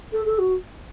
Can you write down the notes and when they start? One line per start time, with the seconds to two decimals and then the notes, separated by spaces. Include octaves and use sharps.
0.12 A4
0.25 A4
0.38 F#4